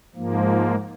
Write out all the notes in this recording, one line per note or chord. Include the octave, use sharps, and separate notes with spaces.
G#2 F3 A#3